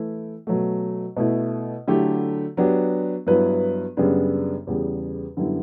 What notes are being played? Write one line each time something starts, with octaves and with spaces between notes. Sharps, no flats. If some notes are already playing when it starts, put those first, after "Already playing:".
Already playing: E3 A3 E4
B2 F#3 A3
B2 A3 E4
D3 F#3 A3 E4 G4
F#3 B3 D4 G4
G2 F#3 B3 E4 B4
F#2 C#3 G3 B3 D4
E2 C#3 G3
F#2 D3 G3 B3 E4